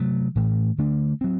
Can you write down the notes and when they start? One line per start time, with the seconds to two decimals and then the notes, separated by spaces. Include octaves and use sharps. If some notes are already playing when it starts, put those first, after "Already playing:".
Already playing: C3 F#3 A3
0.36 A2 E3 A3
0.78 D3 A3 D4
1.21 F#3 C4